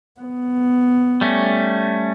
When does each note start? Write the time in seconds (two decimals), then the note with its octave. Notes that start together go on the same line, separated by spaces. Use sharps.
0.20 B3
1.21 G3 A3 C#4